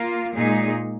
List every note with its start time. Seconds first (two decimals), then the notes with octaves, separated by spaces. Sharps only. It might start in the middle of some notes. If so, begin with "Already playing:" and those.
Already playing: A#3 F4
0.34 A#2 G#3 D#4 G#4